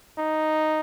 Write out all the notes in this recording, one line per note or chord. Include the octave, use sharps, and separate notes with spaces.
D#4